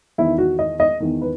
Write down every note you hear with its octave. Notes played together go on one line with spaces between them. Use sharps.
E2 D#3 E4
F#4
D#5
D#5
E2 D#3
B4